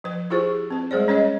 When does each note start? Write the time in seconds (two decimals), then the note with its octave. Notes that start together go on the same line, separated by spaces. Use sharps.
0.04 F3 B4
0.30 E4 F4 G4 G#4 C5
0.70 C4 B4
0.91 G3 G#3 G#4 C5 D5
1.08 C#4 B4 C#5 D#5